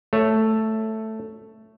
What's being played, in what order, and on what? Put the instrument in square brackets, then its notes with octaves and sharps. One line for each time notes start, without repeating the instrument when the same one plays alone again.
[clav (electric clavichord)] A3 C#5